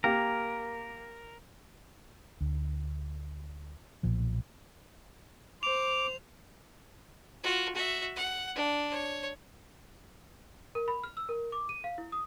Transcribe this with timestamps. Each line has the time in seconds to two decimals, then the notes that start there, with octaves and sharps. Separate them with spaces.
0.04 A#3 G4 A#4
2.41 D2
4.03 B1 A#2 F3
5.63 C5 D6 F7
7.43 F4 F#4
7.75 F#4 E5
8.16 F#5
8.55 D4
8.91 C#5
10.75 A#4
10.88 B5
11.04 F6
11.17 E6
11.29 A#4
11.52 D6
11.69 D#7
11.84 F5
11.98 E4
12.12 D#6